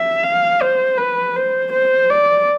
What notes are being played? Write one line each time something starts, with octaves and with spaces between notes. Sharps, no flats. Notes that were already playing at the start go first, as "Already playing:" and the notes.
Already playing: E5
F5
C5
B4
C5
C5
D5